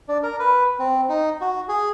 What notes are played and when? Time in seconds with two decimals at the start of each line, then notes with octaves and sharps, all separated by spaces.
0.09 D4
0.23 A#4
0.39 B4
0.79 C4
1.09 D#4
1.41 F#4
1.68 G#4